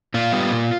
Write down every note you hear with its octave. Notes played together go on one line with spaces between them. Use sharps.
A#2 F4
G3 B3
A#2